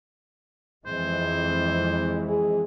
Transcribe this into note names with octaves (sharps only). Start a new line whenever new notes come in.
F2 E3 G#3 C5
G#4